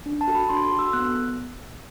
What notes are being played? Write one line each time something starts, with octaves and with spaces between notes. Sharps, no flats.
D4
A5
F#4 A4
B5
D4 C6
C6
F#4 A4
E6
B3 F#6